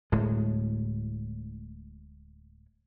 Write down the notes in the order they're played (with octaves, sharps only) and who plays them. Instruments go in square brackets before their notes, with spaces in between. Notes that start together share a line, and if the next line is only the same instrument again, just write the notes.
[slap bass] D1 A2 G#3